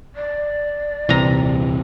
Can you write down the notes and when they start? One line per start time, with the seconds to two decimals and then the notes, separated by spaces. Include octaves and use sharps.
0.16 D5
1.09 D#1 C2 C3 E3 A#5